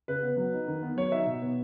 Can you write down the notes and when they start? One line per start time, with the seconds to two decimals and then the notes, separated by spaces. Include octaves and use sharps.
0.08 C#3 B4
0.23 B3
0.37 F#3
0.53 D#4
0.68 D#3
0.83 B3
0.97 F#3 C#5
1.12 D#4 E5
1.26 B2
1.42 B3